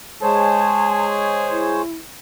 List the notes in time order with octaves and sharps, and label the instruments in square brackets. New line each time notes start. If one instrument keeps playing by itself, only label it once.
[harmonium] G#3 C5 C#5 [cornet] G#4 [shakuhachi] A5
[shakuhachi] E4